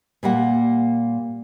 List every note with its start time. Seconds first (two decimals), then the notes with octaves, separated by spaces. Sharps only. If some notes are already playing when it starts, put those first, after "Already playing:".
0.23 A#2 G3 A#3 F#5